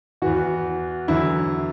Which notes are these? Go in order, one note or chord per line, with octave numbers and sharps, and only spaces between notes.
E2 E3 F#4
E2 D3 F#3 E4